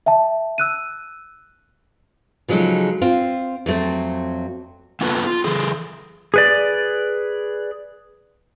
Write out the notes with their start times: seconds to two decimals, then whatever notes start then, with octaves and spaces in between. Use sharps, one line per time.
0.06 E5 G5 A5
0.58 E6 F#6 D#7
2.48 C#3 F3 F#3 G#3 D#4 A4
3.02 C4 F4
3.66 F2 F#3 A3 C4
5.01 A#3 B3 F4 A4 B4
5.27 F4
5.44 E3 G#4 A4
6.34 G#4 B4 D5